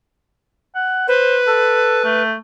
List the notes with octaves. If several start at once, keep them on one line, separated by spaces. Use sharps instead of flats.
F#5
B4 C5
A4
A3